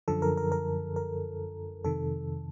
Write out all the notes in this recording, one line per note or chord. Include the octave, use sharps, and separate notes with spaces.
F#2 D3 F3 A4
A#4
A#4
A#4
A#4
F2 C3 D#3 A4